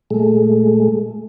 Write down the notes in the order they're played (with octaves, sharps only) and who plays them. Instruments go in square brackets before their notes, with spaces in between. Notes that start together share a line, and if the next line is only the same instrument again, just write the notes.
[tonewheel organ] A#2 G#3 A3